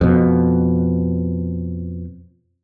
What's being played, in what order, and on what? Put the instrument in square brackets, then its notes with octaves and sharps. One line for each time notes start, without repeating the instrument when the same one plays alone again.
[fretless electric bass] F2 B2